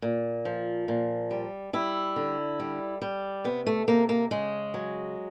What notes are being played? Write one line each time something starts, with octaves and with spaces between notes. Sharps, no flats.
A#2
F3
A#2
G3
G3 E4
D3
G3
G3
C3 B3
A3
C3 A#3
A#3
C#3 G#3
F#3